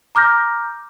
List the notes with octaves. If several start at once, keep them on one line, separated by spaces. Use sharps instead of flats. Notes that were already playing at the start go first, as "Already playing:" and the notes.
A#5 D6 F6 G6 A#6